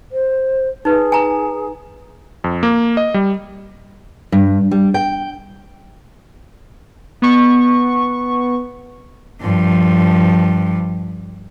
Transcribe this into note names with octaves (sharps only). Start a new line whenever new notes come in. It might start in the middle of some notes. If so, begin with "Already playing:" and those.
C5
D#4 G#4 B4
G#5 A#5
F2
A#3
D#5
G3
G2
G3
G5
B3 C#6
G2 F3